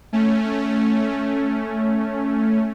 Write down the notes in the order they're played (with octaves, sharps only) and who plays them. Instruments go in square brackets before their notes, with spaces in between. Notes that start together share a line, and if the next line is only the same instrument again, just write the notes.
[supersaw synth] A3 C#4